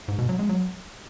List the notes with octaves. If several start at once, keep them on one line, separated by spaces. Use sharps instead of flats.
G#2
B2
F#3
G#3
F#3